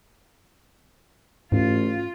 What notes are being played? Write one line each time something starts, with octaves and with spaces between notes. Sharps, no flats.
A1 G#2 F4